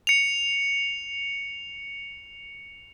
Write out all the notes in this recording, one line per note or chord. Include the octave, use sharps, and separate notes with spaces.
C#7 F7